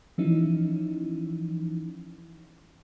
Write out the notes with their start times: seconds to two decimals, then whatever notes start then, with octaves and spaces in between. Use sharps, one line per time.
0.18 E3 F3 C#4 D#4 E4